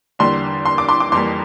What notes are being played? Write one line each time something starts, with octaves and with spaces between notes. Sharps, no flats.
E2 D3 G3 A#3 D4 C6
C6
D6
C6
D6
F2 E3 G3 A#3 C6